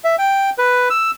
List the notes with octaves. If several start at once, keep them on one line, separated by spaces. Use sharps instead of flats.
E5
G5
B4
E6